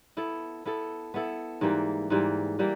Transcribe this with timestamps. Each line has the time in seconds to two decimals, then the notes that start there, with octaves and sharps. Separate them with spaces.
0.17 B3 E4 A4
0.66 B3 E4 A4
1.14 B3 E4 A4
1.61 G#2 E3 G3 A#3
2.10 G#2 E3 G3 A#3
2.59 E3 G3 A#3